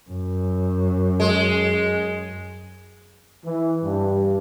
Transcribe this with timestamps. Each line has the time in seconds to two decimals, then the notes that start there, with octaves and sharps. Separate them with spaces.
0.11 F#2
1.20 G#3
3.46 E3
3.84 G2